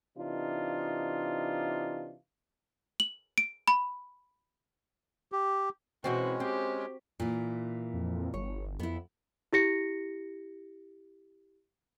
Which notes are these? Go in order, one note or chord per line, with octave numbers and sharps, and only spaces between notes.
C3 E3 D4 D#4 F4
F#7
D7
B5
G4
B2 E3 G#3 C4 C#4 F#4
C4 G4
A#2 E3
F2
G1 C#5
F2 B3 E4
E4 G4 A#6 C#7